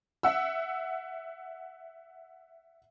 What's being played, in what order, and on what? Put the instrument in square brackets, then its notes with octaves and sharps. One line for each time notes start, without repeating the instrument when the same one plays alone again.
[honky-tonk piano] E5 F#5 E6